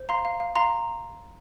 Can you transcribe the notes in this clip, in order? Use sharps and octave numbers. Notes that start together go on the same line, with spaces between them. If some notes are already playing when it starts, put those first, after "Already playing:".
Already playing: C5
F5 A#5 C6
F5
F5
F5 A#5 C6